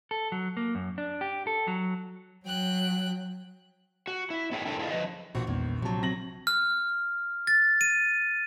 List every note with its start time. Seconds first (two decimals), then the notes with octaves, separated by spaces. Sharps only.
0.11 A4
0.32 F#3
0.57 A#3
0.75 F#2
0.98 D4
1.21 G4
1.47 A4
1.68 F#3
2.46 F#3 G5 F#6
4.07 F#4
4.30 E4
4.51 B3 D#4 G#4 F5 G5
4.66 D4 E4 A4 A#4 C5 G5
4.79 E4 F4 G#4 A#4 D#5
4.91 F3 B4 D#5
5.35 A#1 E3 A#3 F#4
5.47 E2 D#3 G#3 B3
5.82 C3 F3 F#3 A5
6.03 C4 A#6 F#7
6.47 F6
7.47 A6
7.81 D#7